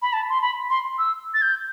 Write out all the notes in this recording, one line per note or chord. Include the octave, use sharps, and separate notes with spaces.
B5
A5
C6
B5
C6
E6
A6
G6